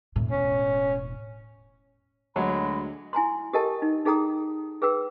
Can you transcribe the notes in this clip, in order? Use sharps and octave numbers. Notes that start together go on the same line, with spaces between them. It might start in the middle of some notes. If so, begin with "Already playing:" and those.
E1 A2
C#4
D2 F#3 G#3 B5
E4 G#5 A#5 C6
G4 A4 A#4 D#5 G5 A5
D#4
D#4 G#4 A4 G5 A#5 D#6
G#4 B4 G5 E6